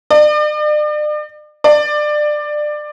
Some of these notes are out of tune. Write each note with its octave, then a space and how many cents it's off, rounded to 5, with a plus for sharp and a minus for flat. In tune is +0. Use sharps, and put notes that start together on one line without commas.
D5 +40
D5 +20